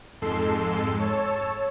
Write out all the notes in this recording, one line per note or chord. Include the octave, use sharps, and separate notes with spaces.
F2 G#2 G#3 A4 C6 E6
C#5 A5 E6